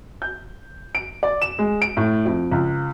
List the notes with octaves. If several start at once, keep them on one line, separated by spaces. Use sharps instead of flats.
G6
D7
D5
E7
G#3
D7
A2
F2
C#2